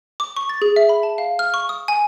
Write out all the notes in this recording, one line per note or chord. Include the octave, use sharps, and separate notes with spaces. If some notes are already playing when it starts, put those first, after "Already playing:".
D6
C#6
A6
G#4
E5
B5
A5
F5
F6
C#6
D#6
G#5